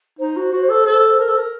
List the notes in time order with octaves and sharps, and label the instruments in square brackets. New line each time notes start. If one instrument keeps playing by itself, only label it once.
[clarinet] D#4 [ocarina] C5
[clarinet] F#4
F#4
A4
A4
A#4
A4
A#4